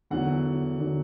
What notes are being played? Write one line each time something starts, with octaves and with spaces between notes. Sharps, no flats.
E2 D3 F#3 F#5
E2 D3 F#3